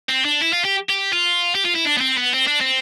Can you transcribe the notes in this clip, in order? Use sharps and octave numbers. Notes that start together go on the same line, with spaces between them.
C4
D4
E4
F4
G4
G4
F4
G4
F4
E4
D4
B3
C4
B3
C4
D4
C4